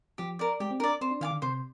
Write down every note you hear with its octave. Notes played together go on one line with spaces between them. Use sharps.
F3 G4
A#4 D5
G#3 G4
C4
D4 A#4 D5
C4 C5
D4
D#3 F5 G#5 D6
D3
C3 C5